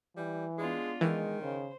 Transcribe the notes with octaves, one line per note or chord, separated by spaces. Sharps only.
E3 G3
G#3 B3 D4 F4
D#3 E3 G#3
C#3 C5